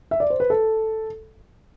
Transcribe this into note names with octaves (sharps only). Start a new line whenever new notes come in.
E5
D5
C5
B4
A4